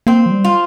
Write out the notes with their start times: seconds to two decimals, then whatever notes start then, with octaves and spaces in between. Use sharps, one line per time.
0.07 A#3 C4
0.26 F3
0.31 G3
0.44 F4